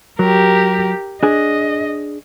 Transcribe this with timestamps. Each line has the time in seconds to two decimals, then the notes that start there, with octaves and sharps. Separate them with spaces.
0.19 F#3 G4 A#4
1.23 D4 G#4 D#5